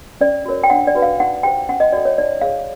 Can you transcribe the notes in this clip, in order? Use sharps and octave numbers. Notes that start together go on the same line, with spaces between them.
C#4 D5
F#4 A#4 C#5
G5
D4 F#5
D5
F#4 B4
F5
D#4 F#5
G4 C5 G5
C#4 F#5
D#5
F#4 A4 D5
C#5
D#4 D5
G#4 C#5 F5